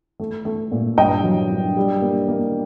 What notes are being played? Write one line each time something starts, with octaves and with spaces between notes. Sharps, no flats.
A3
A3
A#2
G2 D#5 G5
F#3
G2
G3
A#3
A#3